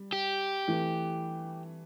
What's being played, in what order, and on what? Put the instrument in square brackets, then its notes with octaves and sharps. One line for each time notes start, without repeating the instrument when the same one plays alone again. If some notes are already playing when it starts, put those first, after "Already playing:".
Already playing: [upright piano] G3
[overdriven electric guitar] G4
[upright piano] E3 A3